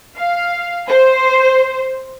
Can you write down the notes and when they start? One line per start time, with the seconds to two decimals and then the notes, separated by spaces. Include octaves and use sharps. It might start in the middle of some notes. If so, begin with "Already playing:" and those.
0.17 F5
0.87 C5